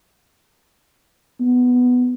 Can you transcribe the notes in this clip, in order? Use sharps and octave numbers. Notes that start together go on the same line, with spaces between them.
B3